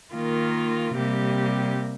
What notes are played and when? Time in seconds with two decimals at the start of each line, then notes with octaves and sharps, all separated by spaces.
0.15 D#3 A#3 F4
0.95 C3 G3 A#3 G4